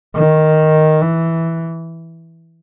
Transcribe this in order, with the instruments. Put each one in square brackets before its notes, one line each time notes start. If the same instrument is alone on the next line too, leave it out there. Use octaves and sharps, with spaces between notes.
[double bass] D#3
E3